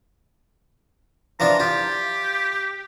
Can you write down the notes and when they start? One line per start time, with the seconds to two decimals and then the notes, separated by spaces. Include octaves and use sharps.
1.40 E3 F3 D4 A#5
1.60 F4 G4